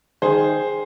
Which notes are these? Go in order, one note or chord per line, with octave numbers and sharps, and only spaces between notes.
D#3 G#4 C5